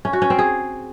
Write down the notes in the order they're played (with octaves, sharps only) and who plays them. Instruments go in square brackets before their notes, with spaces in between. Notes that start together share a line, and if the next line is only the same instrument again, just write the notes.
[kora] C#4
F#4
C#4
C4
G#4